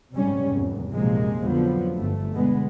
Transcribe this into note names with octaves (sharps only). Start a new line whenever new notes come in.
F#1 G#2 C3 G3 C#4
F1 E2 G#2
A#1 F#2 C3 F3 G#3 A#3
F2 D3 F3 F#3 B3
G1 A3
B2 D3 G#3 B3